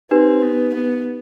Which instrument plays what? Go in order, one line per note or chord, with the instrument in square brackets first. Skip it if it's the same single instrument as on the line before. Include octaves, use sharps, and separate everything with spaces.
[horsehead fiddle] C4 [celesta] D#4 G4 B4
[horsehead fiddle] B3
B3